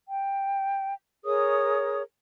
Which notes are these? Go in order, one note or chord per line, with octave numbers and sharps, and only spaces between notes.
G5
G#4 A#4 C#5 D#6